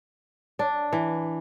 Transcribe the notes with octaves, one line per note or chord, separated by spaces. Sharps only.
D4
E3